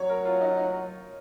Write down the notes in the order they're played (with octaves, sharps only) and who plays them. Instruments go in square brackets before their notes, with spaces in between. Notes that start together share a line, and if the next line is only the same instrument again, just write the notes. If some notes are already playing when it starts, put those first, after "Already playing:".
Already playing: [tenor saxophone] F#3 [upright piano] C#5
[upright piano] A#4
F4
D#4
F4
D#4